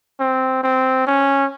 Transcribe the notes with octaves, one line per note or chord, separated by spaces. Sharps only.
C4
C4
C#4